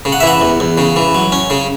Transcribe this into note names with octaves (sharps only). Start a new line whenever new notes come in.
C#3
F#5
E5
E3 F#5
E2
E2
C#3
E3
F#3
C#4
C#3